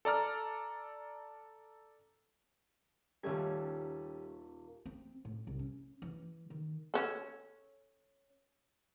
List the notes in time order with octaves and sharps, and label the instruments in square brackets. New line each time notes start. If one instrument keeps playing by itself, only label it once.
[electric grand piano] A4 D5 A#5 F6
[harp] D#1 G#6 [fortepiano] G3 A3 C#4
[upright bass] C4
A2
C2
C#4
E3
D#3
[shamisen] C#4 A4